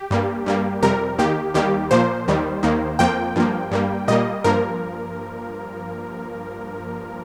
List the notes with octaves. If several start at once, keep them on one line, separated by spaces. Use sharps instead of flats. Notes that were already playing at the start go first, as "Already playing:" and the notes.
Already playing: G4
G2 G3 A#3
G2 G3 A#3
F2 C3 G3 A#4
D#2 D#3 A#3 G4
D#2 D#3 G3 A#3 G4
A#2 F3 A#3 C5
D#2 D#3 G3
D#2 D#3 A#3
F2 F3 A#3 G5
G2 F3 A#3
G2 G3 A#3
A#2 G3 A#3 D#5
G2 F3 A#3 A#4